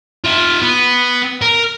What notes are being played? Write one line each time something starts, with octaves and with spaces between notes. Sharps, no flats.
F4 E5
B3
A#4